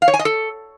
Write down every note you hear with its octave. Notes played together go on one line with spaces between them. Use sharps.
F5
C#5
G#5
D#5
A4